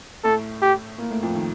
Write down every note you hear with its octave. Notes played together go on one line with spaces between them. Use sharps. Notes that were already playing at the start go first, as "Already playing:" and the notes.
A2 A3 A4
G4
A#2 A#3
A2 A3
F2 F3
D#3